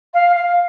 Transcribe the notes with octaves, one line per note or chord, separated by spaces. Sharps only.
F5
F5